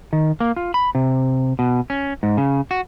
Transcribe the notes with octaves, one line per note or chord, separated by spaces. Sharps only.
D#3
A#3
F4
B5
C3
B2
C#4
G#2
C#3
F#4